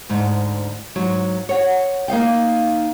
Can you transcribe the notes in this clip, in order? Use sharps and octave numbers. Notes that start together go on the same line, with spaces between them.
D2 G#2
G#2 F#3
C#5 F#5
A#3 D#4 F5 G5